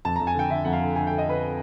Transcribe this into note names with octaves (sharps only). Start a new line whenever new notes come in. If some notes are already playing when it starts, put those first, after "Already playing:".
F2 A5
F2 A#5
G#5
D3 G5
D3 E5
F2 F#5
F5
D3
D3 G#5
D3 G5
D#5
D3 B4